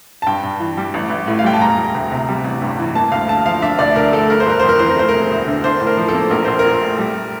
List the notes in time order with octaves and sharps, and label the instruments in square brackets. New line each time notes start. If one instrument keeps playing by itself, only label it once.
[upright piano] A5
G2 G5
G2
E3
G3
A1
A1
A2
F5
G3 G5
A5
E1 A#5
E1
D2
C3
G3
A1
G2
E3
A#3 A5
D2 F5
D3 A5
F3 F5
D4 E5
D2 D5
D3 A#4
A3 A4
G1 A#4
C5
G1 A#4
F2 C5
A#4
E3 C5
A#4
A3 C5
E1 A#4
D2
D3
D4 C5
A2
A#4
F3
A4
A#3
A#1 A#4
A#1 C5
A#4
A#2
A3
G3